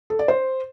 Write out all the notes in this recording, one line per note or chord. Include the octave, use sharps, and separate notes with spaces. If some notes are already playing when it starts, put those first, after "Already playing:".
A4
D5
C5